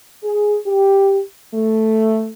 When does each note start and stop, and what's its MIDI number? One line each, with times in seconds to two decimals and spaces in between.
0.24 0.57 68
0.66 1.20 67
1.54 2.28 57